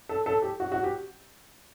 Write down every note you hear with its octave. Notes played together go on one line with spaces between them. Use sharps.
A4
A4
G4
F#4
F#4
G4